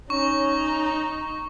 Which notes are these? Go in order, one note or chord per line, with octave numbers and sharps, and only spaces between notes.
C#4 D#4 C#6